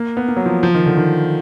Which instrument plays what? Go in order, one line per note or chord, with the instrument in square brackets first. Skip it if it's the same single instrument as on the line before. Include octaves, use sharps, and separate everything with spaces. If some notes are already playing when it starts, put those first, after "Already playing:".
Already playing: [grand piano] A#3
B3
A#3
F#3
F3
F3
D#3
D3
D#3